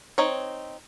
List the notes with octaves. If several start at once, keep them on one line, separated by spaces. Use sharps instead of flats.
C4 D#4 C#5